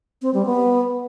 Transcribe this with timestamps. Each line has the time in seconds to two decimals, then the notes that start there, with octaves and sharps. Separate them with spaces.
0.22 C4
0.34 G3
0.46 B3